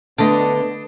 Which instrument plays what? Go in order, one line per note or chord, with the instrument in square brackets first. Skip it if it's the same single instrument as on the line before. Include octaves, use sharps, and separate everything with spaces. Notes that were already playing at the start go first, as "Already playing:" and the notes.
[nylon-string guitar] D3 A3 [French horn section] B3 B4 [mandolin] D4 D#5